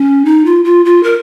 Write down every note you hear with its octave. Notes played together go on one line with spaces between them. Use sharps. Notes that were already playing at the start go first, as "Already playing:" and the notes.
Already playing: C#4
D#4
F4
F4
F4
A#4